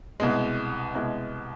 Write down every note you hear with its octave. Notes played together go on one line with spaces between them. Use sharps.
C2 B2 G#3
C2 B2 G#3